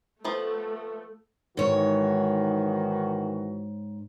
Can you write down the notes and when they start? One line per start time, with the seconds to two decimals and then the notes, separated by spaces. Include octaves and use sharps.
0.24 F3 A3 B3
1.57 G#2 D#3 E3 F#4 C#5